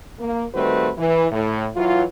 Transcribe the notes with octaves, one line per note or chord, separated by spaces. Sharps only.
A#3
D#3 G3 A3 C4 F#4 B4
E3
A2
E3 F#3 F4